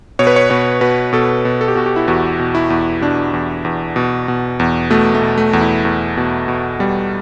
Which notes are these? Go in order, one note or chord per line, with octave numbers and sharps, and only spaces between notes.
B2 C#5
B4
C#5
B2 C#5
B2 B4
B2 A4
B2
A4
G4
B2 F#4
G4
E4
E2 F#4
B2
E4
E2
B2 D4
E2
E2
B2
B2
E2
B2 A3
A3
B2
A3
E2
E4
E2
B2
B2
B2 G3